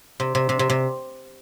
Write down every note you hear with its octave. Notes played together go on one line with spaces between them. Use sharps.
C3
C3
C3
C3
C3